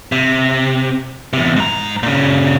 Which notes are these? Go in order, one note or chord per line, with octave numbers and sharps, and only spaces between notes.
C3
E2 C3
G#2 A#5
A#2 C#3